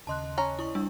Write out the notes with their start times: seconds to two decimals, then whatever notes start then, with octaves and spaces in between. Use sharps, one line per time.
0.07 D#2 C#3 D#5 A5 C6 F#6
0.38 C#4 A#5
0.59 E4 C#6
0.75 G3 D4 E6